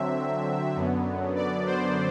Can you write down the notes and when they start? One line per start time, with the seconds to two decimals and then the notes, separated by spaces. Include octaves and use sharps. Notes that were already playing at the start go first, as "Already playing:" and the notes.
Already playing: D3 F#3 C4 E5
0.76 F#2 D3 F#3 B3
1.36 D5
1.66 C5